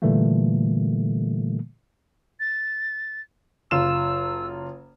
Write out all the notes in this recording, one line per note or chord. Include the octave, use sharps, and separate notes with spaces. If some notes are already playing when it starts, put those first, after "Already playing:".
A#2 D3 E3 G3 A3 A#3
A6
F#1 F4 E6 E7